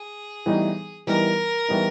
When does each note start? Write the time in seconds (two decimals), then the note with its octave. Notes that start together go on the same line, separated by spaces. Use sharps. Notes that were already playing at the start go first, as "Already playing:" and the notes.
Already playing: G#4
0.46 A2 E3 G3 B3 D#4
1.07 A2 E3 G3 B3 D#4 A#4
1.69 A2 E3 G3 B3 D#4